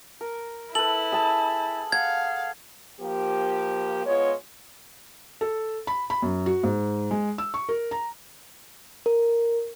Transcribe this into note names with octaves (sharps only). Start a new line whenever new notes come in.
A#4
E4 A4 B4 F#7
G#4 A5
F5 F#5 G#6
F3 A#3 G4
G#3 B3 F4 C#5
A4
B5
B5
F#2
F#4
G#2
G#3
E6
C#6
A#4
A#5
A#4